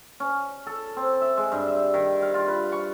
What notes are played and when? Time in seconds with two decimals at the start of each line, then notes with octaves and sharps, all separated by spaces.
0.20 C#4
0.67 A4
0.97 C4
1.21 E5
1.37 G#3
1.52 G2
1.68 E5
1.94 D#3
2.22 F5
2.34 F4
2.48 B4
2.72 C#6